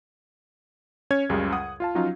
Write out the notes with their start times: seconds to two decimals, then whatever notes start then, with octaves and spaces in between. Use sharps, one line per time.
1.11 C#4 C#5 G#6
1.29 C#2 F#2 C#3 G3
1.52 F#5 D#6
1.80 F4 F5 A5
1.95 F3 F#3 C#4 D#4 F4 F5